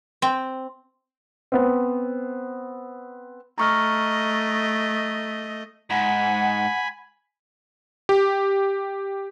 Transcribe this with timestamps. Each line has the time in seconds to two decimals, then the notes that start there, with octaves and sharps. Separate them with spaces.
0.22 C4
1.52 B3 C4
3.58 A3 D#5 A#5 C#6 F6
5.90 G#2 F#5 G#5 B5
8.09 G4